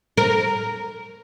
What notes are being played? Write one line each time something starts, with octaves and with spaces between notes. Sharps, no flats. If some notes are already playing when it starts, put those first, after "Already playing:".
A#4